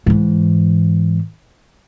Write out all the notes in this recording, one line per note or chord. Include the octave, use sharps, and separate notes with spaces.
G#2 E3